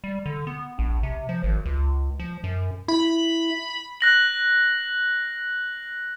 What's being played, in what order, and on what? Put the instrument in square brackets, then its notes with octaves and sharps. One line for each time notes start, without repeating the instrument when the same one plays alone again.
[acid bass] G3
D3
B3
A#1
C3
F3
G#1
C#2
F3
F#2
[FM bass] E4 [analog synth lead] B5
[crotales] F#6 A#6 F#7